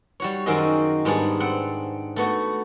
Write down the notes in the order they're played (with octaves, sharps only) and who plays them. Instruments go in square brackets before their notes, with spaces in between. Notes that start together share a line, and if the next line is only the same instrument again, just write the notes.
[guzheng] G3 F#4 C#5
F#2 D#3 C4 F#4 G#4 D#5
G#2 G3 B3 D4 G#4
C4 F#5
A3 B3 F#4